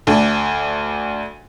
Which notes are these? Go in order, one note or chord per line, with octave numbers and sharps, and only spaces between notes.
D2 D4